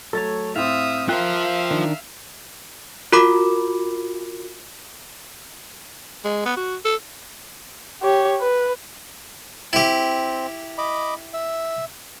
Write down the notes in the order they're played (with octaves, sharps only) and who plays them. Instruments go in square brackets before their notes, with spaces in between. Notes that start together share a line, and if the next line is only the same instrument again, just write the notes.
[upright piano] F#3 A3 A6 [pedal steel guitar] A4 C#5
[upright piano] A2 C4 [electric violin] E5 D#6 [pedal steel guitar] F5
[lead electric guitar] F4 C5 [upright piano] A#4 G5 [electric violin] E5 F5 [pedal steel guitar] F#6
[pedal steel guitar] D#3 D4
[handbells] F4 F#4 A#4 B5 D6
[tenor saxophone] G#3
B3
F#4
A4
[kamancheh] G4 C#5
B4
[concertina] C4 [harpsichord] E4 G4
[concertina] D#5 B5 D6
E5